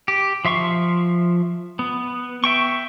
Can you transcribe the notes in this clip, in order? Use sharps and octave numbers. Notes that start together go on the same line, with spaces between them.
G4
F3 E5 C6 C#6
B3
E5 G5 C#6